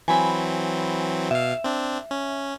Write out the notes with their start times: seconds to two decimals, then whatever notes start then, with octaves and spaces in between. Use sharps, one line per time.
0.08 E3 F#3 C4 G#5 B5
1.31 B2 E5 F5
1.64 C4 D4
2.11 C#4